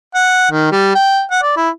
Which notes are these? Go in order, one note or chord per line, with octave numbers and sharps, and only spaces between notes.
F#5
D#3
G3
G5
F#5
D5
E4